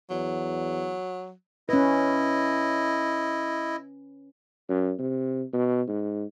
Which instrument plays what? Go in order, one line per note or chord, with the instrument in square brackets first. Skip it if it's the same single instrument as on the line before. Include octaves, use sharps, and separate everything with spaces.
[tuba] E2 [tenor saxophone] F#3
[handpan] C#4 B4 [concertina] E4 D#5
[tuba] F#2
C3
B2
G#2